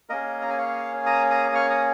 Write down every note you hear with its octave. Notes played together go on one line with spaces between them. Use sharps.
A#3 C#4 G#4 A#4 D#5
A#5
G#5
C#5 F5
A#5 D#6
A#5 D#6
D#6
C#6 F6
A#5 D#6